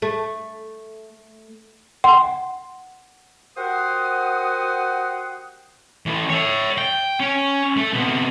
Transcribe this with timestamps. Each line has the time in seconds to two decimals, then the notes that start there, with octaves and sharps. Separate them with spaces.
0.02 A3
2.04 F#5 C6
3.56 F#4 G4 A#4 C5 F#5 D#6
6.06 E3 A3
6.30 C#5 E5
6.78 G5
7.20 C#4
7.77 A3
7.93 C3 B3